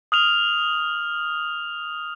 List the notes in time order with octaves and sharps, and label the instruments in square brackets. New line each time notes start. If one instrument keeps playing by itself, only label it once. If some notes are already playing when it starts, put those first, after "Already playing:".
[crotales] D#6 F6 F7